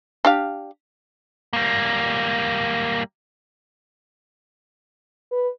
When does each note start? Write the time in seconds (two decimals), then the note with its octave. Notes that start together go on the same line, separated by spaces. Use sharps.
0.25 D4 G4 F5
1.53 G3 A#3
5.32 B4